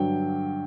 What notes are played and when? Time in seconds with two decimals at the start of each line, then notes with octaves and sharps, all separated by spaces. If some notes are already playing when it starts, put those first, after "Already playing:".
Already playing: G2 D3 F#3 G5